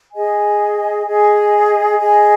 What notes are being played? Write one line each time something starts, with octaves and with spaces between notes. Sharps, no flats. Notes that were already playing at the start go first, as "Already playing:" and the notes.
G#4 D#5 G#5
G#4 D#5 G#5
G#4 D#5 G#5